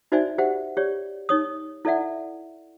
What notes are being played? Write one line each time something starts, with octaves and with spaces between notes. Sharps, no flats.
D#4 F#4 C5 D5 E5 G#5
G4 C5 E5 F#5
G4 C#5 D5
D#4 C#5 D#6
E4 A4 D5 E5 F#5